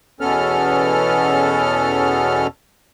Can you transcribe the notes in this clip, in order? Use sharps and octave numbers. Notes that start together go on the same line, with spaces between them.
E2 B2 B3 C#4 A4 F6